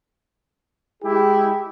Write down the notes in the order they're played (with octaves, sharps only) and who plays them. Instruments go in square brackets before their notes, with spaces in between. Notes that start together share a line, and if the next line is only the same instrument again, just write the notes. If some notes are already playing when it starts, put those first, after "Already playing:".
[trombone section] G#3 G4 G#4 [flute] E4